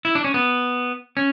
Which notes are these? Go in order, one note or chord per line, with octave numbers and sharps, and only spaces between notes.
E4
D4
C#4
B3
C#4